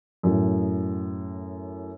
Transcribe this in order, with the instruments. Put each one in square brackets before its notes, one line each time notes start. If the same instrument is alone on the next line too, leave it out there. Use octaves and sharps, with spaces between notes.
[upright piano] F#2 A2